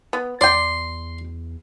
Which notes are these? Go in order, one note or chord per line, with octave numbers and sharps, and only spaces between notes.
B3
E2 D5 G5 C6